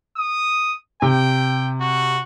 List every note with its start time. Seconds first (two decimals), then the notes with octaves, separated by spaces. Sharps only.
0.17 D#6
1.02 C3 G5
1.81 F#4